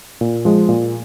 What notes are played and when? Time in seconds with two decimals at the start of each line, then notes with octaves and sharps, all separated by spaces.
0.21 A#2
0.45 F3 G#3
0.69 A#2